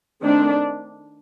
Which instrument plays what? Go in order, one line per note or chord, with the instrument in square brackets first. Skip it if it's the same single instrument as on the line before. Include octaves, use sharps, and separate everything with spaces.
[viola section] D#3 A3 C4 D4